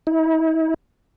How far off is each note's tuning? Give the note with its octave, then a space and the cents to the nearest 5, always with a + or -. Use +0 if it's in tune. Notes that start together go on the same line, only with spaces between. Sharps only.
E4 -45